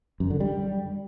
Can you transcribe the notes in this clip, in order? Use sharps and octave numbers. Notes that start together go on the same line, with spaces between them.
F#2
D3
G3